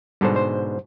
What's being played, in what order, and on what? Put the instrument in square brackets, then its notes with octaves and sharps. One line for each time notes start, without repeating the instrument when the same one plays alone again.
[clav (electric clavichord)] G#2 B2 D3 [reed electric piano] G3 A4 C5
[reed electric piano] C5